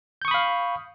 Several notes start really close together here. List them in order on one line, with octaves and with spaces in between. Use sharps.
G6 C#6 D#6 B5 F5